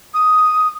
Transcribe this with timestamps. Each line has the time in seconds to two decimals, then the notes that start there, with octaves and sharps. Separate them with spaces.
0.14 D#6